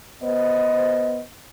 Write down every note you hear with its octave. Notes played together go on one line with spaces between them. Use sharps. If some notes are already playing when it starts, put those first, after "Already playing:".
B3 C5 D#5